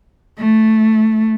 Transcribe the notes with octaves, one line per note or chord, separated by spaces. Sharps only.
A3